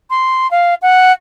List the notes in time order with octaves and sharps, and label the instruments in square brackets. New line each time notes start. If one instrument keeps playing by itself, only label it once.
[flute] C6
F5
F#5